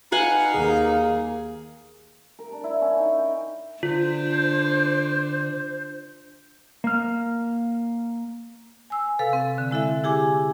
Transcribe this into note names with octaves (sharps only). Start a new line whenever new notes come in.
D#4 B4 F5 F#5 G#5
D#2 A#3 G#4
A#4
D4
E4
C#4
D#4
G5
D3 D4 F4 C5
A#3 F6
G#5 E6
C3 A4 B4 F5
C4
D3
G#3 E4 A4 E5
E4 G4 G#4 G#5 D6